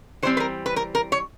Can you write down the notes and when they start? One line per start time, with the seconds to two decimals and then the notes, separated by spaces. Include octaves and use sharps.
0.23 E3 G3 C4 C5
0.37 B4
0.40 A#4
0.66 B4
0.76 A#4
0.95 A#4
1.12 C#5